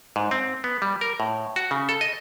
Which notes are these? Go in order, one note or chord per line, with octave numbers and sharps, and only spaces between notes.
G#2
C4
B3
G3
A#4
A2
F#4
C#3
A4
D#5